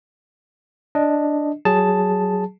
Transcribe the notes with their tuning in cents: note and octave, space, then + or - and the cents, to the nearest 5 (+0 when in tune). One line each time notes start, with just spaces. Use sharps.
D4 +0 D#5 +0
F#3 +15 G#4 +0 A5 +0